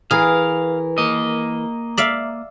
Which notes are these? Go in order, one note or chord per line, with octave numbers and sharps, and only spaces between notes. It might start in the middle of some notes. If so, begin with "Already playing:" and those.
E3 G#4 A#4 B4 F5
A#3 D#5 A#5
D5 E5 F5